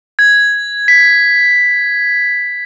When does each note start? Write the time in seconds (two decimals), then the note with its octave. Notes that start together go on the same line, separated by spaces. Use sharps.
0.19 G#6
0.88 B6